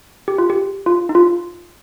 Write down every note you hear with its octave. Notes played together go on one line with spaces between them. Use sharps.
G4
F4
G4
F4
D#4
F4